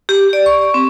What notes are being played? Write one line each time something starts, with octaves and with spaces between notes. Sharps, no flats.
G4
D5
C#6
C4